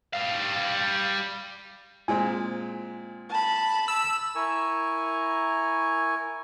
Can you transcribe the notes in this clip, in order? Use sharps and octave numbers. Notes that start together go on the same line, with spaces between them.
G3 F5
A#2 G#3 C4 G#5
A5 B5
E6
E4 A#4 G#5 C#6